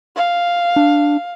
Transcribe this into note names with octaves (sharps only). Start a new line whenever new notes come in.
F5
D4